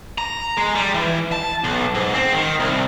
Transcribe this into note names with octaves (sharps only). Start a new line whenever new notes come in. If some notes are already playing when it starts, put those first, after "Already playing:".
A#5
G#3
G3
E3
A5
B1
G#2
C4
D#3
C2